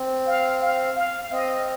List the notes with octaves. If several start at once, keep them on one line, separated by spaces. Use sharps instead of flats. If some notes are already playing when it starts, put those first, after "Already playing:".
Already playing: C4
F5
F5
F5
C4 D#5